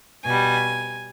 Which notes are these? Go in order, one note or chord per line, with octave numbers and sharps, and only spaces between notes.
B2 G3 G#5